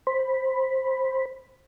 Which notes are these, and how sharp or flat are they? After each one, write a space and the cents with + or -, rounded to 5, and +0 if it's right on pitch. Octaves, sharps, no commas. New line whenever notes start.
C5 +10 B5 +0